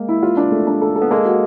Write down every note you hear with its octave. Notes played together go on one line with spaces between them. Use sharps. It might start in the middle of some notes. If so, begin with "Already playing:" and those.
Already playing: G#3 A#3
E4
F4
D4
A3
D4
A4
A4
B3
G#3 A#3 A4
F#4